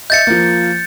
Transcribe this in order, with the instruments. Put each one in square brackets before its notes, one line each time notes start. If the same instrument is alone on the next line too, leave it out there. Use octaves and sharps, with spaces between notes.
[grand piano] D#5 E5 [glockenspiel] G6 A6 C#7
[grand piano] F3 A#3